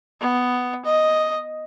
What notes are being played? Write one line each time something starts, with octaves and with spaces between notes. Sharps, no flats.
B3
D#5